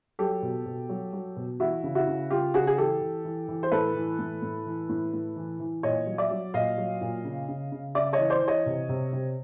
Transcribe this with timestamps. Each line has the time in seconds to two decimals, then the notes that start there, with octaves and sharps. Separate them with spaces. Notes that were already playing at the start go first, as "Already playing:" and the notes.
0.19 F#3 G4 A4
0.42 B2
0.66 B2
0.89 F#3
1.13 F#3
1.37 B2
1.60 E3 E4 F#4
1.83 C#3
1.95 E4 F#4
2.07 C#3
2.30 C#3 F4 G4
2.54 C#3 F#4 G#4
2.67 G#4
2.77 E3 G4 A4
3.01 E3
3.25 E3
3.48 E3
3.63 C5
3.72 A2 A4 B4
3.95 E3
4.19 A2
4.42 A2
4.66 E3
4.89 A2
5.13 A2
5.36 E3
5.60 E3
5.83 A#2 C#5 D#5
6.07 F#3
6.18 D5 E5
6.31 F#3
6.54 A#2 D#5 F5
6.78 F#3
7.01 A#2
7.25 C#3
7.49 C#3
7.72 C#3
7.95 C#3 D5 E5
8.13 C#5 D#5
8.19 E3
8.30 C5 D5
8.42 E3
8.48 C#5 D#5
8.66 C3
8.89 C3
9.13 C3